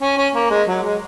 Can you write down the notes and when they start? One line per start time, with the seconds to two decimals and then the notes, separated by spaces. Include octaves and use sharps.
0.01 C#4
0.17 C#4
0.34 A#3
0.50 G#3
0.68 F#3
0.83 G#3